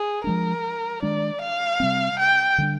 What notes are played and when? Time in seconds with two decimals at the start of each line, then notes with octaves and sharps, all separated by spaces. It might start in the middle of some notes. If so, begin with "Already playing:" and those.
Already playing: G#4
0.24 F3 G#3 D4 A#4
1.02 D#3 G#3 D4 D5
1.41 F5
1.80 C3 G3 C4
2.19 G5
2.58 D3 G3 D4